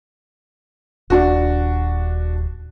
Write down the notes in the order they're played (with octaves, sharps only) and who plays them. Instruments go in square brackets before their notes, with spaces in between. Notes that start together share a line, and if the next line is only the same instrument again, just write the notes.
[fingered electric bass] D#1 [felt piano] D4 F#4